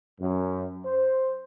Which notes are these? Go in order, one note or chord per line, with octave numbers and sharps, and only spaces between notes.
F#2
C5